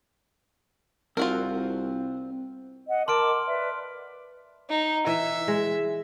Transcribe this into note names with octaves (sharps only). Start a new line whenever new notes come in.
C2 C4 F4 F#4 A#4
D#5 F#5
A#4 A5 C6 D6 F6 D7
B4 D5 E5
D#4
E3 E5
G#3